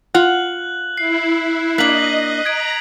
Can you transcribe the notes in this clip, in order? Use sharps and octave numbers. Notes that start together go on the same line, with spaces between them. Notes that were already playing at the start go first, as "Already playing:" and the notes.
F4 F#5 F#6 F#7
E4 C7
A#3 D4 D#5 F#6 B6 F#7
A#5 G#6 D7